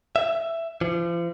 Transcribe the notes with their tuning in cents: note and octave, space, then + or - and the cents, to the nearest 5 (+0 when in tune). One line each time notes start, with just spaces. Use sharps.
E5 +10
F3 -40